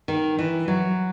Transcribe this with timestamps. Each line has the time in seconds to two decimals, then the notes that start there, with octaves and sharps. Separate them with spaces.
0.08 D#3
0.39 E3
0.68 F#3